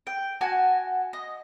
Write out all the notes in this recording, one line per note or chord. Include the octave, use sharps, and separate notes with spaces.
G5
F#4 G#5 A5
D#5